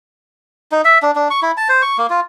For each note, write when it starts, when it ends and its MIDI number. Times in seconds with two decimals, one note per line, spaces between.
0.72 0.82 63
0.85 0.98 76
1.02 1.11 62
1.16 1.28 62
1.30 1.40 85
1.42 1.51 64
1.57 1.68 81
1.69 1.82 72
1.82 1.97 85
1.98 2.07 58
2.10 2.20 65